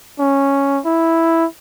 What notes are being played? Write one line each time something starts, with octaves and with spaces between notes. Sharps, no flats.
C#4
E4